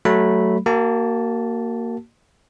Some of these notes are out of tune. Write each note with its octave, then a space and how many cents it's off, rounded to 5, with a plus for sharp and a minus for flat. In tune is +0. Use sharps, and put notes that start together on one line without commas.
F#3 +20 A3 +0 B5 -5
A#3 -10 F#4 +35 A5 +0